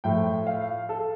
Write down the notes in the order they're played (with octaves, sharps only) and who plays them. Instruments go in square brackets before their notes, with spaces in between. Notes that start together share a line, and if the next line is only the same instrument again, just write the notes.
[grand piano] A2 F3 A3 G5
F5
A4